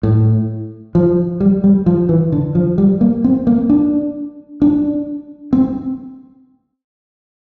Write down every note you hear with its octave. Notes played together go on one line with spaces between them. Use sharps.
A2
F3
G3
G3
F3
E3
D3
F3
G3
A#3
C4
A#3
D4
D4
C4